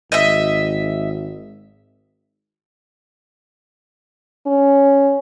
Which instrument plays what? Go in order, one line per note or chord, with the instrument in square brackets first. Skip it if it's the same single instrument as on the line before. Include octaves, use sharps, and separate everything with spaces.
[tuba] G#1 [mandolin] D#5 E5
[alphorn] C#4